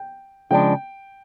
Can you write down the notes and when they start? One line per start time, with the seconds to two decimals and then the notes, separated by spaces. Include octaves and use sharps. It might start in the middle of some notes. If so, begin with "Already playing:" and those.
Already playing: G5
0.51 C#3 F3 G#3 B3 D4 G5